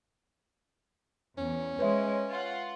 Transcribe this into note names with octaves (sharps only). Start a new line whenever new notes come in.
E2 C#4
G#3 B4 C#5 E5
F4 F#5